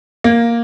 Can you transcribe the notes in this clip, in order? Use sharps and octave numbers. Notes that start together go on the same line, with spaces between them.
A#3